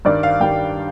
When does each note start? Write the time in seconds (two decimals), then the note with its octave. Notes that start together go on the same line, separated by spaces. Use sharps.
0.05 G2 D#3 G3 D5
0.23 F5
0.40 G2 D#3 G3 G5